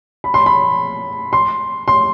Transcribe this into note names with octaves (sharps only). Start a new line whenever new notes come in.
B5
C6
B5
C6
C6